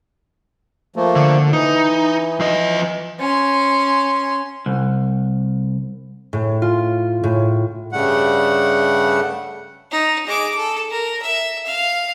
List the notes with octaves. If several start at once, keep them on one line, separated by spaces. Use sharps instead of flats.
F3 A3 A#3
D3
E3 D#4
F3 D#5
C#4 C6
C2
A2
F4
A2
G2 C#3 G3 A3 F#5
D#4
G#3 D6
A4
A#4
E5
F5